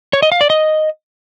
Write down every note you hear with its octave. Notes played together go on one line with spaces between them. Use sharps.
C#5
D#5
F5
D5
D#5